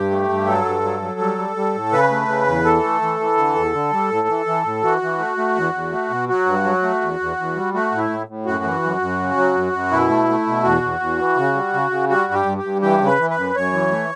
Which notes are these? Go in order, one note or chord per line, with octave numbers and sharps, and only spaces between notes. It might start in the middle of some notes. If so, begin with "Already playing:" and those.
Already playing: G2 G4
A3
G2
F#3 A4
G2
F#3
F#3
G3
G3
G3
A2
C#3 B4
A3
C#3
E2
E3 A4
A3
E3
E3
D3
E2
D3
G3
A2
E3
E3
A2
E3 F#4
E3
A3
A3
E2
E2
A3
B2
F#3 F#4
G2
F#3
A3
E2
E2
E2
G3
A3 F#4
A2
E4
A2
A2
F#2 F#4
E3
F#2
F#2
C#3
F#3
F#2
F#2
B2 E4
A3
A3
B2
E2 F#4
E2
E2
E3
C#3
G3
C#3
C#3
G3 F#4
G2
G4
G2
G4
G2
E3 G4
C#3
B4
E3
B4
F#2
F#2 C#5
E3
A3